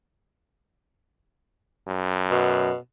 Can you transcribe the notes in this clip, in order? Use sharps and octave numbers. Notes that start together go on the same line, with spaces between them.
F#2
B2